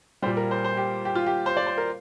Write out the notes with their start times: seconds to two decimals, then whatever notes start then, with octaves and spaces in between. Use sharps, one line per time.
0.22 G3 C5
0.26 A#2
0.37 A#4
0.51 C5
0.64 C5
0.77 G4
1.05 G4
1.15 F4
1.26 G4
1.46 C5
1.57 D5
1.67 C5
1.78 A#4